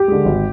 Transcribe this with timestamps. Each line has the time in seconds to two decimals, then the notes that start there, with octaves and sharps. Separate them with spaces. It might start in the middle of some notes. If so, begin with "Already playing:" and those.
Already playing: G4
0.08 D3 G#3
0.25 G#1